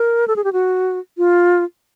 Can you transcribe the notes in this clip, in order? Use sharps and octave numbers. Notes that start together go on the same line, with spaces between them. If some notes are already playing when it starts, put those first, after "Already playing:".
Already playing: A#4
A4
G#4
G4
F#4
F4